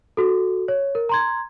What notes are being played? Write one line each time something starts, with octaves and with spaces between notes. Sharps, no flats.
F#4 A4
C#5
A#4
A#5 C6 G#6